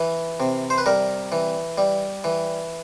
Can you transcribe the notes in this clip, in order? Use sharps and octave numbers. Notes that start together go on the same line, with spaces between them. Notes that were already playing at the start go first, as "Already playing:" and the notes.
Already playing: E3
C3
C5
B4
G3 A#4
E3
G3
E3